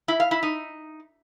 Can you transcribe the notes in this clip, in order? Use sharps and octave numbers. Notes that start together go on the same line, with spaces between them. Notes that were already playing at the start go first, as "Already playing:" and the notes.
E4
F5
E4
D#4